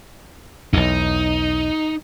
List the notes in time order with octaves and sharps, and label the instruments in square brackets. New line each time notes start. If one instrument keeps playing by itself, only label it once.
[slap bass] B1 E2 [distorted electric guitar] D#4